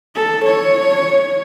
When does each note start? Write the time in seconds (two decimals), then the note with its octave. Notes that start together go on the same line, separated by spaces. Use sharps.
0.16 A4
0.45 C#5